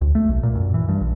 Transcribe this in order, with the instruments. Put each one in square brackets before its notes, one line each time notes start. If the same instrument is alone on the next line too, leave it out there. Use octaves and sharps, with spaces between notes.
[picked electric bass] D2
A3
B1
A#2
F#2
E3
G2
A#1